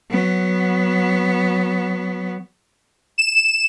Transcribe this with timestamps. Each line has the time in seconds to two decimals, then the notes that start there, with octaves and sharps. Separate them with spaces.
0.11 F#3 B3
3.18 E7